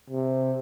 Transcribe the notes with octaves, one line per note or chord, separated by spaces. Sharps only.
C3